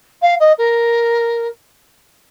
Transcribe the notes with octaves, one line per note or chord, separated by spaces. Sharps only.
F5
D#5
A#4